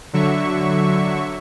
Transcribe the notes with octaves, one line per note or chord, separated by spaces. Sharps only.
D3 F#3 E5 C#6